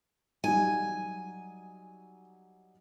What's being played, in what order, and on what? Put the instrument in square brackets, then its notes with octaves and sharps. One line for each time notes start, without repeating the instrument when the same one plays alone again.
[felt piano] F#3 G3 D#4 [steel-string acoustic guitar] G#5